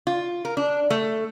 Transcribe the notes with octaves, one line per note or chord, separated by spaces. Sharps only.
F4
A#4
D4
A3